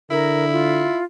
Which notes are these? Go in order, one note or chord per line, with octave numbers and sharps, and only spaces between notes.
D3 E4 A#4
F4